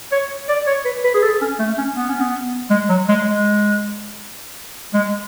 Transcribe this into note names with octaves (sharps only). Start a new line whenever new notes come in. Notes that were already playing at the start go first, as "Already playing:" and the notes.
C#5
D5
C#5
B4
B4
G#4
A4
C#4
A3
C#4
B3
C#4
B3
G#3
F#3
G#3
G#3
G#3